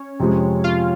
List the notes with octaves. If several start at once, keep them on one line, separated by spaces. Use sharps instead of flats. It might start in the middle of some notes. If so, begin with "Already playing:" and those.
Already playing: C#4 C#5
F2 C3 F3 G#3
F4 F5